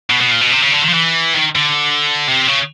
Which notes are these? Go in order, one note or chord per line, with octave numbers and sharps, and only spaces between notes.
B2
B2
A#2
B2
C3
C#3
D3
D#3
F3
E3
D#3
D3
C3
C#3